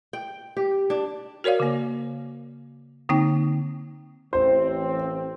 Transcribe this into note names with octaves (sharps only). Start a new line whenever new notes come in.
G5
G4
D4
F#4 A#4 C#5 D5 F5
C#3 A#3
D3 A#3 C4 D#4 G5
A1 C4 C5